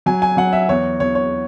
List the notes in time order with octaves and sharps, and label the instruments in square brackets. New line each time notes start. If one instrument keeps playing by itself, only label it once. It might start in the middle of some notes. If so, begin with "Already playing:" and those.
[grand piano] F#3 G#5
G#5
F#3 F#5
E5
E2 C#5
E2 C#5
C#5